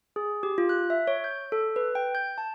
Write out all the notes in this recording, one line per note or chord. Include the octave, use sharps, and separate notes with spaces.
G#4
G4
F4
F#6
E5
C#5
G6
A4
B4
G5
G6
A5